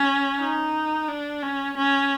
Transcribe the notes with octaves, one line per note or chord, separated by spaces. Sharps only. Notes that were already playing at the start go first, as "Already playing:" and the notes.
Already playing: C#4
D#4
D4
C#4
C#4